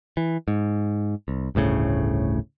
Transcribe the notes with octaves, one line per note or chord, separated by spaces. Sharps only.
E3
G#2
C2
G1 D2 A2 C#3